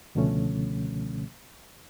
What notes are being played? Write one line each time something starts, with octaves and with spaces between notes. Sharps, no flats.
C#2 B2 D3 F3 A3 C#4